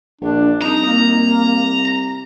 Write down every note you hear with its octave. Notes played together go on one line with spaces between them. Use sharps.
A#1 D4
C2 D#4 A#5
A#3